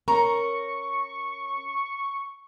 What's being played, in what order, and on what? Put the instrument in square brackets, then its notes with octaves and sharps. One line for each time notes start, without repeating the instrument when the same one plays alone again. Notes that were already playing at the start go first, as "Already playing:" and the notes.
[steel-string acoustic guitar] C#4 A#4 [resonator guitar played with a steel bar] A#5 [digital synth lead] C#6